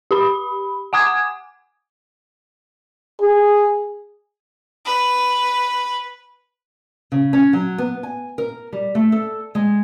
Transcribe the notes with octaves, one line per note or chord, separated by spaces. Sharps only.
G4 B5
F#5 G#5 D6 D#6 G#6
G#4
B4
C#3
C#4
F#3
B3
G#5
A#4
G3
A3
A4
G#3